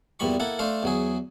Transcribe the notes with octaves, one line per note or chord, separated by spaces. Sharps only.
E2 A#2 G3 B5 C#6
A#3 E4 A4 F#5
A3 D4 A4 C5 F5
E2 F#3 G#4